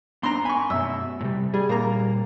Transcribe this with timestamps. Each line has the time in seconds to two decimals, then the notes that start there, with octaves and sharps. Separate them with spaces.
0.23 B3 C4 D4 A#5 C6
0.45 G#5 B5 C#6
0.70 F#2 B2 E5 E6
1.21 A2 C3 G3
1.54 G3 G#4
1.69 A#2 G3 A#3 A#5